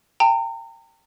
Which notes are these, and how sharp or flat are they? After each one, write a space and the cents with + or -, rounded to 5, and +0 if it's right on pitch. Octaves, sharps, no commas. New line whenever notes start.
G5 +10 A#5 -35